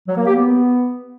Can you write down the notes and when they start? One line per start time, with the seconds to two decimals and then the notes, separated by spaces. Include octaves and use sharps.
0.08 F#3
0.17 A#3
0.26 G4
0.36 B3